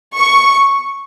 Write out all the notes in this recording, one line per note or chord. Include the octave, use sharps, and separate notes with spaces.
C#6